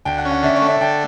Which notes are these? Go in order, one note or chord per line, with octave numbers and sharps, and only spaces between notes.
D2 G5
F#5
C#4
F#5
D3 E5
C#5
A3
E5
D3 G5